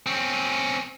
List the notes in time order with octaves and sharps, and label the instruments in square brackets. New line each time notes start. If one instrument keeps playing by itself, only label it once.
[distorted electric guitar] C4 C#4